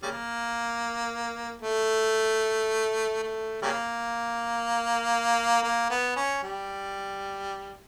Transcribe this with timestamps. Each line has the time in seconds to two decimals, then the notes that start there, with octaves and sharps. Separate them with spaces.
0.03 C#3 G3 A#3
1.62 A3
3.23 A3
3.62 C#3 G3 A#3
5.63 A#3
5.90 B3
6.16 C#4
6.43 G3